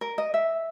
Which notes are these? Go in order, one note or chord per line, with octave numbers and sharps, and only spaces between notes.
A#4
D#5
E5